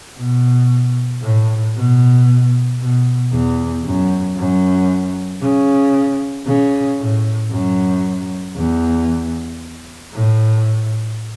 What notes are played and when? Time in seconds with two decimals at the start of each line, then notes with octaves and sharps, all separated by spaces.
0.17 B2
1.22 A2
1.75 B2
2.79 B2
3.32 E2
3.84 F#2
4.37 F#2
5.41 C#3
6.46 C#3
6.98 A2
7.51 F#2
8.56 E2
10.13 A2